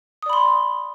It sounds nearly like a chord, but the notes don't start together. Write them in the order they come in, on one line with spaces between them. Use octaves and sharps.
D#6 D5 B5 C6